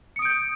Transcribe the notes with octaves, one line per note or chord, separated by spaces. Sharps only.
D#6 G6 C#7 D7